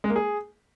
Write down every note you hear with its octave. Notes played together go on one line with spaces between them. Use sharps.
G#3
A#3
G#4